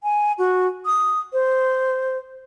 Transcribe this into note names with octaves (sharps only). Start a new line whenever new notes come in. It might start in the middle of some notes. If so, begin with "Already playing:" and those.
G#5
F#4
D#6
C5